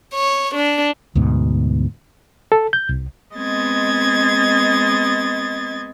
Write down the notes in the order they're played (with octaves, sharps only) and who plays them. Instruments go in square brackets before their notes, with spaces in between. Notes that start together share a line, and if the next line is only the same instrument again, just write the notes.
[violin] C#5
D4
[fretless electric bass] D2 G#2 B2
[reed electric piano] A4
G6
C2
[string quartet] G#3 B3 C4 D#5 G#6 A6